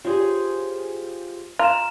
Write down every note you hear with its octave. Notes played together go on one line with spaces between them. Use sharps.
F4 G4 G#4 C5 C#5
F4 A#5 E7